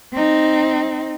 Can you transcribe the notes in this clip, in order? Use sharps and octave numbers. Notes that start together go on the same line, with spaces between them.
C4 D#4